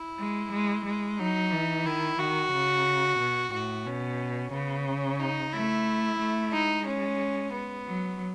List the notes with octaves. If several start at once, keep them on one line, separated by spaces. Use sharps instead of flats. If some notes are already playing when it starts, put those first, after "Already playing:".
Already playing: E4
G#3
G#3
G#3
F#3 D#4
E3
D#3 E4
D#3 F#4
C#3
B2
A2 F#4
B2 C#4
C#3 B3
C#4
D#4
A3 E4
A3
G#3 D#4
C#4
B3
F#3